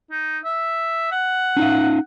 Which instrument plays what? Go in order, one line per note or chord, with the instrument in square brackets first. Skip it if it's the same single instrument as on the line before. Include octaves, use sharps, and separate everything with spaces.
[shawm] D#4
E5
F#5
[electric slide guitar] C#4 D#4 F5